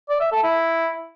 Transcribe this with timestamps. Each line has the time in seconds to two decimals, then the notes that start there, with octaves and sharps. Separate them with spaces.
0.09 D5
0.21 E5
0.32 A4
0.43 E4